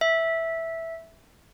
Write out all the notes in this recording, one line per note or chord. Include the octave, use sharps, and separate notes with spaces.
E5